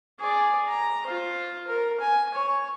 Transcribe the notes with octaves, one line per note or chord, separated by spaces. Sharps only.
G#4 D5
A#5
F4 C5
A#4
G#5
C#5